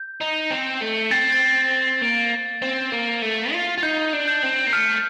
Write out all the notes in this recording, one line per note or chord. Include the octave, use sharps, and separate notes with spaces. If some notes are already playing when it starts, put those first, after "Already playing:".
Already playing: G6
D#4
C4
A3
C4 A6
A6
A#3
C4
A#3
A3
F4
F4
D#4 G6
D4
G6
C4
A#3
A3 F6